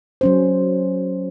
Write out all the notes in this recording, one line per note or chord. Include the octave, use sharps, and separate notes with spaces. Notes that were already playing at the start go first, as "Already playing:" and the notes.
F#3 C#4 C5